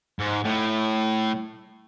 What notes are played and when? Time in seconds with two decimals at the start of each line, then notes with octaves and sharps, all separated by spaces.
0.19 G#2
0.44 A2